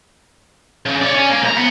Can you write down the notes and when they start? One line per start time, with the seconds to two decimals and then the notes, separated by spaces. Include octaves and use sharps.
0.86 C#3
1.01 C#5 D5
1.14 C#4
1.30 A#3
1.42 C2 A#5
1.57 B3